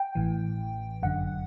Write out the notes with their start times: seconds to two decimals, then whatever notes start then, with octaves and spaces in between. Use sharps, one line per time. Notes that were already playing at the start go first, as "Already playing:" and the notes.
Already playing: G5
0.15 A1 A2 E3
1.03 G1 F#2 D3 F#5